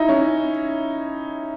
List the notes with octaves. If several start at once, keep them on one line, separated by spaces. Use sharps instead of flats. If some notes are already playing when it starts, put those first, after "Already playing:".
Already playing: D#4 E4
C#4